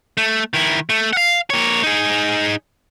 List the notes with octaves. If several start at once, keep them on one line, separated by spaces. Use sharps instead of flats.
A3
D#3 E4
A3
F5 F#5
A#3 C#5
D#4 G#4